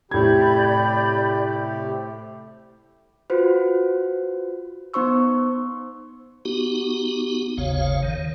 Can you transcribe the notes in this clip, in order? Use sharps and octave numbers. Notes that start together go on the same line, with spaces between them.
A2 C3 G4 D5 B5 G6 G#6
F4 F#4 B4 C5
B3 D#4 C5 C6 C#6 E6
B3 D#4 F#4 G4
G#1 D#2 C#3 C#5 F5
D#3